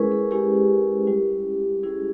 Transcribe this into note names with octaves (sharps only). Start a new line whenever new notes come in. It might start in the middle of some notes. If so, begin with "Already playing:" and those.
Already playing: G#3 C#4 E4 G#4 A#4 B4
G#4
G#3 C#4 E4 G4
G3 C#4 E4
G3 C#4 E4 G#4